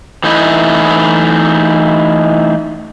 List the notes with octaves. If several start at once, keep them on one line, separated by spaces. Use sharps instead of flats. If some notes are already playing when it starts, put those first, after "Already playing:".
E3 A3 D#4 E4 B4